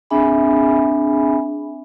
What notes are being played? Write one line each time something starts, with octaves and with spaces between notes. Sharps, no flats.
C4 D4 G#4 E5 G#5 B5